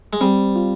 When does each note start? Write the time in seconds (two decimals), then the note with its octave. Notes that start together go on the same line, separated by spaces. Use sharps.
0.13 G#3
0.21 G3 C4
0.56 F4